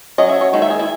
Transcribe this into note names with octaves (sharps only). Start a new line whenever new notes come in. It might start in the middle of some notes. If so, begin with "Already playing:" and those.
F#3 C#4 D#5
E5
C#5
D#3 G#3
E5
G#4
E4